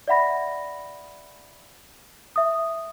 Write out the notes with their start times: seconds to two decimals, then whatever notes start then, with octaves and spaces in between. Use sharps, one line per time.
0.08 D5 E5 F#5 B5 A#6
2.36 E5 D#6